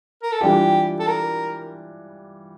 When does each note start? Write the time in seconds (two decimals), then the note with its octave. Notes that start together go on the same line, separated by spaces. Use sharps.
0.23 A#4
0.32 A4
0.41 E3 G3 D4 F4 G4
0.99 A4
1.07 A#4